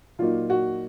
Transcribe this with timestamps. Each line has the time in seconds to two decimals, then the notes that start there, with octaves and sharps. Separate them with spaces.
0.19 A#2 F#3 A#3 D#4 F4
0.50 F#4